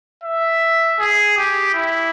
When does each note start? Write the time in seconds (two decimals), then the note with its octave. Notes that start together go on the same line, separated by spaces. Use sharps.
0.23 E5
1.00 G#4
1.37 G4
1.74 E4